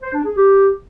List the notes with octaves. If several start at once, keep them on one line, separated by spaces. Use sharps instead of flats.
C5
D4
G#4
G4